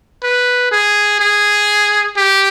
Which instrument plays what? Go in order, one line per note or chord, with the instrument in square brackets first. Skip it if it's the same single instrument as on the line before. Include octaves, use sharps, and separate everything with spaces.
[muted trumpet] B4
G#4
G#4
G4